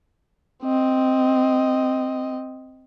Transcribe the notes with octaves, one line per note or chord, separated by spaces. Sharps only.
C4 D#5